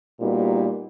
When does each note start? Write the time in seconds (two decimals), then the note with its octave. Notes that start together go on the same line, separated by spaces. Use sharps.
0.20 A#2 G3 B3 D#4 F#4